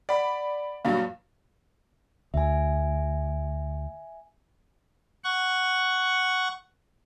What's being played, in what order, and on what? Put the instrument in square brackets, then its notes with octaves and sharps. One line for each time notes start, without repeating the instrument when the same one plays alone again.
[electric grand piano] D5 B5 [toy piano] F#5
[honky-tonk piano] G2 A#2 F#3 [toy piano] F5
[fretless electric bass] D2 [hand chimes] E5 G#5
[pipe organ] F#5 C#6